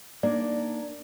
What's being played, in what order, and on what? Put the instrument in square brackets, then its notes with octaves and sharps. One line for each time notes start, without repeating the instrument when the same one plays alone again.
[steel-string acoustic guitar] A#3 D4 D#4 [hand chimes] D5